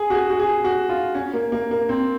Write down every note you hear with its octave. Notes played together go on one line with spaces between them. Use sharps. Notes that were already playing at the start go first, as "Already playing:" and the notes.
Already playing: G#4
F#4
G#4
F#4
G#4
F#4
F4
C#4
A#3
A#3
A#3
C4